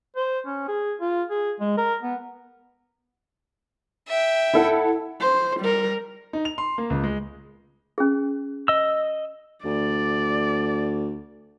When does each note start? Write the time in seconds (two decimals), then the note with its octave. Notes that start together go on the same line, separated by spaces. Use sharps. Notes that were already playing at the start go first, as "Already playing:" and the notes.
0.16 C5
0.46 C#4
0.68 G#4
1.01 F4
1.30 G#4
1.60 G#3
1.77 A#4
2.03 B3
4.07 E5 G5
4.54 E4 A4 F#5
5.20 C5
5.60 G3 A#4
6.33 D#4
6.45 F7
6.58 C6
6.78 A#3
6.90 C#2
7.04 G#3
7.98 C#4 G#4
8.68 D#5 E6
9.65 D2 D5